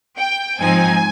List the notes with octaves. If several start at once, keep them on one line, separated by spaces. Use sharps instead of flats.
G5
G#2 F3 C4 D#4 G#5